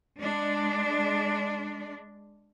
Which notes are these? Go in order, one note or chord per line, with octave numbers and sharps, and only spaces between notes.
G#3 D4